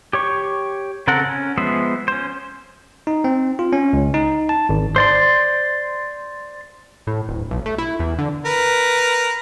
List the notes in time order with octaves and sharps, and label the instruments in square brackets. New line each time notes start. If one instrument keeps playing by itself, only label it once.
[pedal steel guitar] G4 C#5 C#6
C#3 C4 A4 A#4 F#5
C#4
F3 G#3 B3 C5 E5
C#4 C5
[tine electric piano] D#4
C4
F4
C#4
C#2
D#4
A5
G#1
[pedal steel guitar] C5 D5 C6
[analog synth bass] A2
D1
B1
A3
E4
E2
D3
[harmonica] A#4 B4